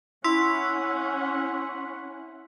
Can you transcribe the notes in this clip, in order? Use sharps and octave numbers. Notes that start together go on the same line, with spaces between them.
C#4 E4 F#5 C6 E6 B6